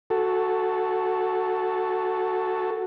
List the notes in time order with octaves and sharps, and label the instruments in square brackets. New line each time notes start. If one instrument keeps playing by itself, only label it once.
[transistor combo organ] F#4 A4